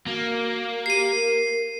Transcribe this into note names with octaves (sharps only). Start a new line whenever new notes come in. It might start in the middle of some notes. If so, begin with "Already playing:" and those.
A#3 F#4
G4 C7 D#7
A#4